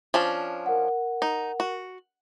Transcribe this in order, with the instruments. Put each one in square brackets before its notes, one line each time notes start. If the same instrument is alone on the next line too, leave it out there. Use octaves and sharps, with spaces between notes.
[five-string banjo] F3 C#4 D4
[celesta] A#4 F#5
[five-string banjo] D#4
F#4